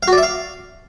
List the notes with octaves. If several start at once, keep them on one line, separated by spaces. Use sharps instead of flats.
F5
F#4
D5
E5
F5